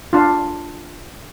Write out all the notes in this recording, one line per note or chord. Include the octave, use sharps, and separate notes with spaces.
D4 F4